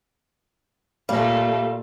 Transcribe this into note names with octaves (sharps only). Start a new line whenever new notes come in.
A#2 G3 A3 F5